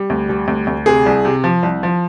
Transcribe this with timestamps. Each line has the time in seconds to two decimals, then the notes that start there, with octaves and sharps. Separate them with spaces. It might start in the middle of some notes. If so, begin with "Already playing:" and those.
Already playing: G3
0.10 D2
0.29 G3
0.48 D2
0.67 D2
0.86 C3 G#4
1.06 C2
1.25 C3
1.44 F3
1.63 C2
1.83 F3